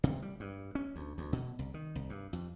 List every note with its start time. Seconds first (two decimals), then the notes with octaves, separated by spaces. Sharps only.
0.04 C3
0.22 G3
0.40 G2
0.75 C#4
0.96 D2
1.18 D2
1.33 B2
1.59 C2
1.74 D#3
1.95 C2
2.10 G2
2.33 F2